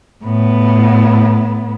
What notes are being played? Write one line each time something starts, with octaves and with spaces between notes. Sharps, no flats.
A2 B3